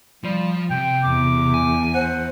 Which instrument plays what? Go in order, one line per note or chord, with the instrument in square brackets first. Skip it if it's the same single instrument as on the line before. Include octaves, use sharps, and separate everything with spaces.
[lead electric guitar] F3 [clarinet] G3
[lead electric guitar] C3 [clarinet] G5
[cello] E2 [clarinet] D6
[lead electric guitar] G#5
[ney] C5 [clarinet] F#5